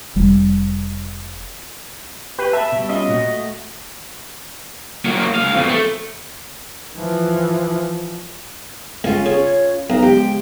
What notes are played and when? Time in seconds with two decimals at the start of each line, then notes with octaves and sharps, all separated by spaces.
0.16 F1 G3
2.38 G4 B4
2.53 E5 A5 B5
2.72 B2 G3
2.89 C#4 F4 D#5 E5
3.10 A#2 F#4
3.25 A3
5.05 F#3 A#3
5.35 C#2 F5
5.54 F2 B2
5.68 A3
6.95 E3 F3
9.04 C#2 C#4 F4
9.26 C#3 C#5
9.90 B1 B4 F5 A#5
10.03 C#3 F3 G#3 G4